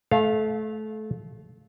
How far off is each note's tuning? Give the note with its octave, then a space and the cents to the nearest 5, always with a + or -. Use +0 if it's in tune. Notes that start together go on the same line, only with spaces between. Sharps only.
A3 -25 F5 +0